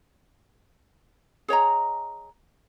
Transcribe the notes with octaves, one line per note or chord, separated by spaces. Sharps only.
G#4 C#5 D#5 A#5